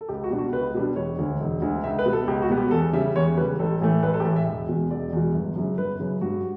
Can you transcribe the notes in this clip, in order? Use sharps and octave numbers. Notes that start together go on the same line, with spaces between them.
A4
C#2 G4
F#4
B2 G3 D4
F#4
C#2 B4
B2 G3 D4
E1 C#5
D2 D3
E1
D2 D3
C#2 E5
B4
B2 G3 B3
A4
C#2 G4
F#4
B2 G3 B3
G4
E2 A4
C#3 G3 E5
E2 C#5
C#3 G3 B4
A1 A4
A2 E3 A3
A1 B4
A4
G4
A2 E3 A3 A4
E5
E1 E5
E2 B2
E1 D5
E2 B2
G1
F#2 C#3
G1 B4
F#2 C#3
G2 F#4